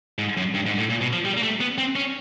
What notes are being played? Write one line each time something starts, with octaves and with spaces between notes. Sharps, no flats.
G#2
F#2
G2
G#2
A2
A#2
B2
F3
G3
A#3
A3
B3
C4
C#4